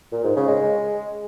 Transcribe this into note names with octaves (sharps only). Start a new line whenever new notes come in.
A#2
G#2
C#3
G#3